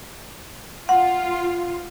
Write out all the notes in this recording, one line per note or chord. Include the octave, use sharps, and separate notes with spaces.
F4 F#5